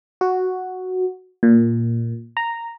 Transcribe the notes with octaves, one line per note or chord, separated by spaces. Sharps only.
F#4
A#2
A#5